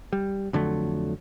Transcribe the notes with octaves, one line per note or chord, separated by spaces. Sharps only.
G3
F2 D3 F#3 A3